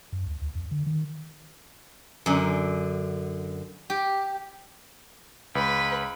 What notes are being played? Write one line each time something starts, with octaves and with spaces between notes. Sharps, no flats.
F#2
D2
D2
F2
D3
D#3
F#2 D3
G4
C#2 B4